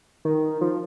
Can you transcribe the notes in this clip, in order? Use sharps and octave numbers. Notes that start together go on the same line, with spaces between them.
D#3
F3